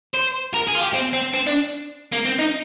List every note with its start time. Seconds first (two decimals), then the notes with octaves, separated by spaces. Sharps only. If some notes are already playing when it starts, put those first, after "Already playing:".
0.15 C5
0.54 A#4
0.68 G#4
0.75 F4
0.81 G4
0.94 C4
1.13 C4
1.34 C4
1.47 D4
2.12 A#3
2.25 C4
2.39 D#4